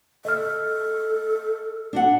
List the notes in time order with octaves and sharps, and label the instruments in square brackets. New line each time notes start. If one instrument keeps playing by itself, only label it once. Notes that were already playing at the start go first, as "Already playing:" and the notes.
[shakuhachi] A4 [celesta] D#5 F6
[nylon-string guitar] D4 F#4 F#5